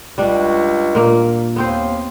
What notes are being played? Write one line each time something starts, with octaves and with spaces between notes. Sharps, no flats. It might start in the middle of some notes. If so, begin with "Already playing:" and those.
C#2 G3 D4
A#2 A#3
D#2 B3 C4 C5